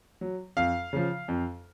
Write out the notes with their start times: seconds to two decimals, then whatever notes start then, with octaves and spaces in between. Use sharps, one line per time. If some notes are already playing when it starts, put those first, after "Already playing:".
0.21 F#3
0.57 F2 F5
0.93 C#3 F3
1.28 F2